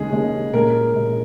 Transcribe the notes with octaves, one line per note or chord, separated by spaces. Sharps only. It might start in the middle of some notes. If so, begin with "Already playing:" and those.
Already playing: D#2 C#3 G#3 C#4 G#4
D#2 C#3 G#3 C#4
A#2 G#3 C#4 A#4
A#2 G#3 C#4